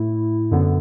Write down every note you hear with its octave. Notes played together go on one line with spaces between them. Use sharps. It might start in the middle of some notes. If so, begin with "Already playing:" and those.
Already playing: A2 A3 E4
F#2 D3 B3